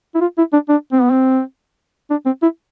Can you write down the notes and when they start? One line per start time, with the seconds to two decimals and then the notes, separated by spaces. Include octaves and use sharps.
0.15 E4
0.21 F4
0.38 E4
0.53 D4
0.69 D4
0.92 C4
1.02 B3
1.11 C4
2.10 D4
2.26 C4
2.42 E4